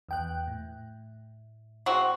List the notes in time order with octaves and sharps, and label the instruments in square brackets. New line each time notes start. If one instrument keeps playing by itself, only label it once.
[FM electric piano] E2 G5 F#6
A2
[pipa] G#3 C4 F#4